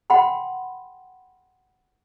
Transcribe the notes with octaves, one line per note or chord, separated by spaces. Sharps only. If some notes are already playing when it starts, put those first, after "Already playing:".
F#5 G5 B5 C6